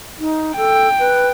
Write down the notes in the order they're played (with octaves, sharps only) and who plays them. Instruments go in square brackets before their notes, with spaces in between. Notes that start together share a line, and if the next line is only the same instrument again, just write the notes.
[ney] D#4
[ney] A4 [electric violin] G5
[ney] B4